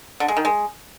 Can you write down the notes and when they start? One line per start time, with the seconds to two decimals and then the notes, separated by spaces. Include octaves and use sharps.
0.20 D3
0.28 G#3
0.37 D#3
0.45 G#3